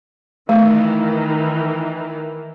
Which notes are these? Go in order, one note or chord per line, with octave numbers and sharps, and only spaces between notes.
D#3 E3 A3